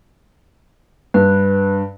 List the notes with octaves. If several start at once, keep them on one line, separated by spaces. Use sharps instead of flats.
G2 B4